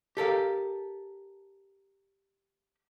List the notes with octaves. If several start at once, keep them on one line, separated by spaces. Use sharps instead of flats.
G4 A4 A#4 F5